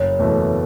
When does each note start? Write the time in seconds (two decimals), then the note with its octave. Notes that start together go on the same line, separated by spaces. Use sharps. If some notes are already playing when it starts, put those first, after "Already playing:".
Already playing: F#1 C#5
0.19 E2 B2 A3